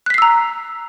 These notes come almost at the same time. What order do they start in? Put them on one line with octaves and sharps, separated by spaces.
F#6 B6 C7 E6 A#5